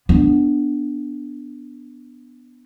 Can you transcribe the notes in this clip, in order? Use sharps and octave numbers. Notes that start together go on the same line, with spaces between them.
B3 D4